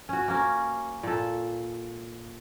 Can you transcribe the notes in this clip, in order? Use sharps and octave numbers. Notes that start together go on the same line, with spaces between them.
C#4 F#4
A#3 C#4
A#2 A4